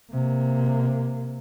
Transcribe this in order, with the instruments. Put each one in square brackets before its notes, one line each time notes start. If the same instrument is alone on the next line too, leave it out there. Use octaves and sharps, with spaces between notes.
[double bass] C3 A#3